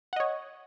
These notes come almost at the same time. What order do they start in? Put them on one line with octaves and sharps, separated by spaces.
F#5 D#5 C#5